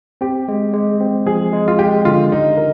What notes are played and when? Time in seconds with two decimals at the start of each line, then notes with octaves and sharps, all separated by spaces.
0.21 C4 G4
0.48 G#3
0.73 G#3
1.01 C4
1.26 F3 G#4
1.53 G#3
1.68 F4
1.79 G#3 G4
2.05 D3 F4
2.32 D#4 G4
2.57 A#4